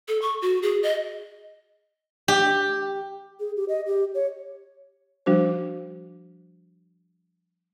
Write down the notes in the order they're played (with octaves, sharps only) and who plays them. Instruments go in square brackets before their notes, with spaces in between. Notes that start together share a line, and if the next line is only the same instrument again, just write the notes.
[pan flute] A4
C#6
F#4
G#4
D#5
[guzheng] G4
[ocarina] G#4
G4
D#5
G4
C#5
[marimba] F3 G3 D4 F#4 C5